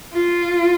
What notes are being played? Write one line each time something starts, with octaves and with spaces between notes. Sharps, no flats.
F4